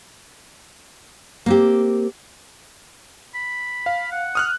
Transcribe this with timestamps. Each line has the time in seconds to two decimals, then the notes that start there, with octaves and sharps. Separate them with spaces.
1.46 A#3 C4 G4
3.35 B5
3.86 F5
4.12 F#5
4.35 D#6 F6 F#6